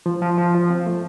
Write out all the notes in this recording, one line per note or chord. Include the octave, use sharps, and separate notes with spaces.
F3
F3
F3
F3
C4
A3